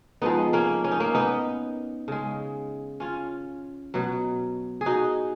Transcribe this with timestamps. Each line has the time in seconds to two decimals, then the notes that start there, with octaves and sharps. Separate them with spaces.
0.22 G#2 F3 G#3 B3 D#4
0.53 A#3 C#4
0.84 C#4
0.91 D#4
1.00 A#3 C#4
1.15 B3 D#4
2.08 C#3 G#3
3.00 C#4 F4
3.94 B2 F#3
4.81 G#4
4.86 D#4 F#4